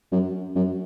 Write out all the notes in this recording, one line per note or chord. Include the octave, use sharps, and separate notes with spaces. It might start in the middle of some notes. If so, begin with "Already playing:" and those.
F#2
F#2